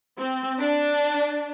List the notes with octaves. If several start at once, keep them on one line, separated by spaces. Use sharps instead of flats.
C4
D4